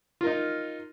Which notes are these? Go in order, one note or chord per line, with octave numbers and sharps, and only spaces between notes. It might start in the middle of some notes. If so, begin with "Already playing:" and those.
D#4 F4 A#4